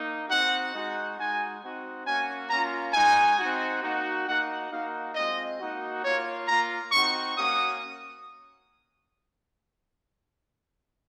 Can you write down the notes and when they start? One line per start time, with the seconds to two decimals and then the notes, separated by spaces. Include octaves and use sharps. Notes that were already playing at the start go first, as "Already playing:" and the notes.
Already playing: A#3 D#4
0.29 C4 D#4 F#4 F#5
0.73 G#3 D#4 F#4
1.18 G#3 D#4 F#4 G#5
1.62 C4 D#4 F#4
2.06 A#3 C#4 F#4 G#5
2.50 A#3 C#4 F4 A#5
2.94 G#3 D#4 F#4 G#5
3.39 C4 D#4 F#4
3.83 A#3 D#4 F#4
4.27 A#3 D#4 F#4 F#5
4.71 A#3 D#4 F#4 F5
5.15 G#3 C4 F4 D#5
5.60 A#3 D#4 F#4
6.03 A#3 F4 C#5
6.47 A#3 F4 A#5
6.92 C4 D#4 F#4 C#6
7.36 A#3 C#4 F#4 D#6